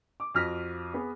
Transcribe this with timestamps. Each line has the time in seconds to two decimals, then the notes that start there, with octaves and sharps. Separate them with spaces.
0.20 D6
0.35 F2 F#4 F6 A#6 B6
0.93 B3 G#4 B4